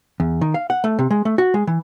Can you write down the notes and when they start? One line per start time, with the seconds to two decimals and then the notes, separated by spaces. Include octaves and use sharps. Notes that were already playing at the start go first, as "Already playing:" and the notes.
0.20 E2
0.41 D#3
0.54 F5
0.70 F#5
0.84 A3
0.99 C3
1.10 G#3
1.25 A3
1.38 F#4
1.54 G#3
1.67 E3